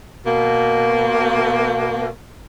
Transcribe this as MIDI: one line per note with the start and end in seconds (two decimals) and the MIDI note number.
0.24 2.08 47
0.24 2.08 58